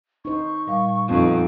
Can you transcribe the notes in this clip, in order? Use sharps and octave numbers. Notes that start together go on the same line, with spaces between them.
D#4 C5 C#6
A#2 G3 F5
F2 B3 C4 D#4 F4